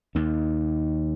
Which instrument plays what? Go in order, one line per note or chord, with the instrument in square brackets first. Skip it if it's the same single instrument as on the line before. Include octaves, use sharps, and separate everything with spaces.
[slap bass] D#2 D#3